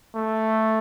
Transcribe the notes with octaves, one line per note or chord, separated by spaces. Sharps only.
A3